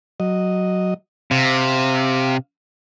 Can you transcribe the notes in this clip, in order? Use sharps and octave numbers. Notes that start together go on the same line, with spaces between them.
F#3 D#5
C3 F5